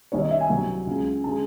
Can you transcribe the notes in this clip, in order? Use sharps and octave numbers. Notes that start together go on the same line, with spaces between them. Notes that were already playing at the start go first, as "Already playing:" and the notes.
C2 C3 D#3 C#5
D#5
E5
G#5
C2 C3 F#3
C#2 C#3 G#3
C#3 G#3 A5